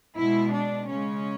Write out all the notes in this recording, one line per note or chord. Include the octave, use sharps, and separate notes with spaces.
B2 G#3 E4
D4
C#3 G#3 C#4